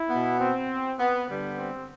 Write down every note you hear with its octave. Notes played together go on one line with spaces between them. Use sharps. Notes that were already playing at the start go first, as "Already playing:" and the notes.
Already playing: E4
B2 B3
C4
B3
D3 G3 B3
C4